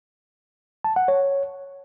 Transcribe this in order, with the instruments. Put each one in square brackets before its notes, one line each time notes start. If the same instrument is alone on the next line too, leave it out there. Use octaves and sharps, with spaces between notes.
[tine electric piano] A5
F#5
C#5